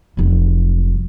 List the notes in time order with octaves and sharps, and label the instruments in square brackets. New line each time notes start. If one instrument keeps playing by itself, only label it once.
[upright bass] F1 F#3